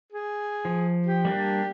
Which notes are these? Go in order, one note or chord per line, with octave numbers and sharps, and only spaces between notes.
G#4
F3
G4
G3 A#3 D4